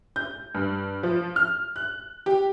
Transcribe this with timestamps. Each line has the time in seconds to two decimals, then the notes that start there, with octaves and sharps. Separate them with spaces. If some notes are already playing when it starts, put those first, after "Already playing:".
0.16 G6
0.54 G2
1.03 F3
1.36 F6
1.76 F#6
2.26 G4